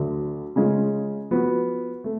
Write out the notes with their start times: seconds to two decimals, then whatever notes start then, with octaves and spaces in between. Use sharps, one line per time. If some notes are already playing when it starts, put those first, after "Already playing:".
Already playing: D2 D3 F#3
0.56 C#3 G#3 C#4 F4
1.31 F3 B3 F#4
2.04 A3